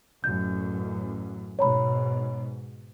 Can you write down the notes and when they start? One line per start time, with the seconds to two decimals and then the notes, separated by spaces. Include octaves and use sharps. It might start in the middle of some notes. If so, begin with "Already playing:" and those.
0.24 A1 F#2 G6
1.59 G#2 B2 C#5 A#5 B5